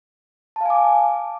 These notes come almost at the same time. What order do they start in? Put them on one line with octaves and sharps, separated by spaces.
A5 F5 G#5 D6